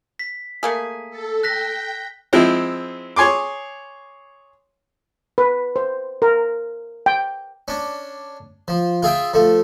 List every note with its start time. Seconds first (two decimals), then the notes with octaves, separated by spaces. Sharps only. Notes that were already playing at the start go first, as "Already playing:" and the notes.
0.19 B6
0.63 A3 A#3 G#4
1.10 A4
1.43 G5 F#6 A#6 B6
2.33 F3 G#3 C4 E4
3.16 G#4 C#5 G#5 C6 D6
5.38 B4
5.76 C5
6.22 A#4
7.06 G5
7.68 C#4 D4
8.68 F3
9.03 F4 G#4 E5 G5
9.34 F3 A3